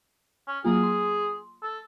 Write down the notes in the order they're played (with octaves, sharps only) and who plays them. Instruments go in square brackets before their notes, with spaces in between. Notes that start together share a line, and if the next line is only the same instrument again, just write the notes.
[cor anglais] C#4
[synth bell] F#3 A#3 F4 [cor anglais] G#4
[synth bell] C6
[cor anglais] A4